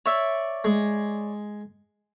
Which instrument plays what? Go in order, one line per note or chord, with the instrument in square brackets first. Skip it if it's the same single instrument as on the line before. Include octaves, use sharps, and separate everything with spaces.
[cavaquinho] C#5 D5 E5
[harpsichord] G#3